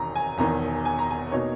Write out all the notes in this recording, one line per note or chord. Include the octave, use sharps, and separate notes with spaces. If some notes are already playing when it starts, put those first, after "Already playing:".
Already playing: E1 E2 D#3 A#5
G#5
E1 E2 D#3 A#5
G#5
A#5
G#5
B2 A#3 D#4 C#5